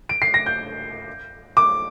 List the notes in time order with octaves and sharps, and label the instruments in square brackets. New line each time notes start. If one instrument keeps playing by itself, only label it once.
[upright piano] D7
C7
A#6
G6
D6